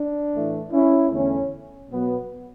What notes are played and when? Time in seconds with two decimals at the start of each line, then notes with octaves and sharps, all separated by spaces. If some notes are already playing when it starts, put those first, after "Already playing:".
Already playing: D4
0.35 A2 E3 A3
0.72 C#4 E4
1.11 E2 D3 A3 C#4
1.90 B2 F#3 B3